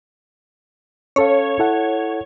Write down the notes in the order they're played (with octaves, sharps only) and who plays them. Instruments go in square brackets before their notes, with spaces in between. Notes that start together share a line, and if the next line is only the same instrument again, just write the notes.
[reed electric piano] C#4 A4 F5 [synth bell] C#5
[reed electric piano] E4 A4 F#5